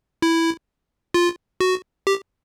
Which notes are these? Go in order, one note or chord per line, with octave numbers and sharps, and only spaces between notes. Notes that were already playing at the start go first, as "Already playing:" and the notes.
E4
F4
F#4
G4